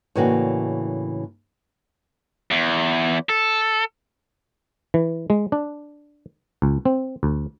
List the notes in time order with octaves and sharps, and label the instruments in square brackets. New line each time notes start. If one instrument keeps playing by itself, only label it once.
[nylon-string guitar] A2 C#3 E3 A#3 D4 F#4
[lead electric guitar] E2
A4
[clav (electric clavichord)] E3
G#3
D4
C#2
C4
D2